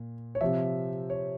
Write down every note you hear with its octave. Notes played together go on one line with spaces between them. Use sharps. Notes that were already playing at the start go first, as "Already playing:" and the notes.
Already playing: A#2
C#5
C3 F3 E5
C#5